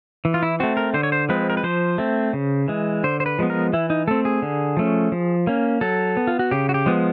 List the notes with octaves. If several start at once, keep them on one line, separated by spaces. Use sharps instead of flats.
E3
F4
E4
A3 C4 F#4
A#4
D3 C5
C#5
C5
F3 G#3 C4 B4
A#4
B4
F3 C5
A3 C4
C#3
E3 G#3
D3 C5
C5
B4
F3 G#3 B3
A#4
E3 E4
D#4
A3 C4 A4
G#4
D3
F3 A3 C#4
F3
A#3 C#4
F#3 A4
B3
F4
F#4
C#3 G4
F#4
G4
F3 G#3 B3